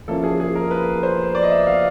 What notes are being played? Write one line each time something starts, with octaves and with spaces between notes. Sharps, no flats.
F3 A#3 C#4 E4 A4
G#4
G#4
A#4
B4
C5
D5
D#5
E5
F5